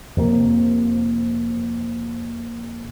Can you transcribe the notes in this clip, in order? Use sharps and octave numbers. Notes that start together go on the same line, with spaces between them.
F2 C3 A#3